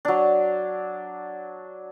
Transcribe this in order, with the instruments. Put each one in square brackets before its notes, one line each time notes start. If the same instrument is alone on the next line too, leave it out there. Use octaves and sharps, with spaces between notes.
[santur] F#3 D4